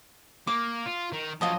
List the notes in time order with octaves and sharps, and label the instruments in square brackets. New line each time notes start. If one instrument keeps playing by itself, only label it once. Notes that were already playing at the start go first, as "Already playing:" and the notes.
[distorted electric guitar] A#3 [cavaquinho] D6
[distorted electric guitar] F4
D#3
[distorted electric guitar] F2 F#3 [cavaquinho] F4 D#5 A5